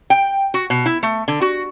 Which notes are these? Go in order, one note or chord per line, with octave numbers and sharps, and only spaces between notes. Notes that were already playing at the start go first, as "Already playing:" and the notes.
G5
F#4
B2
E4
A3
D3
F#4